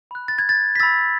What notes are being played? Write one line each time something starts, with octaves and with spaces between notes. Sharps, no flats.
B5 F#6
A6
G#6
A6
B6
B5 E6 A6